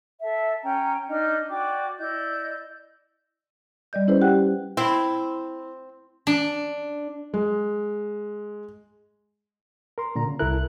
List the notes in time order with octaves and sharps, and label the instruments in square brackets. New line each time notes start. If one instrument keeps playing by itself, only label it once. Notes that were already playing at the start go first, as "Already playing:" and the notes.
[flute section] A4 E5
C#4 G5 A#5
D4 D#4 D#5 F6
F#4 D5 G5 D6
E4 D5 D#5 G6
[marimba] G3 D5 D#5 G6
C#4 E4 G#4 B4 C5
G4 C5 F#5 G5 F#6
[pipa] C4 [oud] E4
[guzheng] D4
[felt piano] G#3
[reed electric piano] A#4 C6
A#2 D3 A#5
C#3
[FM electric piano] C2 F#6 [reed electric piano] E4 A4 A#4